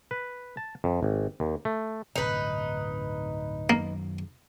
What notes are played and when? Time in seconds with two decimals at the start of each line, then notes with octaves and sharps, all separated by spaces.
0.11 B4
0.57 A5
0.84 F2
1.03 G#1
1.40 D#2
1.65 A3
2.16 D1 G2 C3 D#4 B4
3.70 F#2 D#3 F#3 A#3